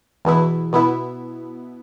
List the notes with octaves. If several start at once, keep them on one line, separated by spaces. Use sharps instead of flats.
E2 B2 B3 E4
B2 B3 E4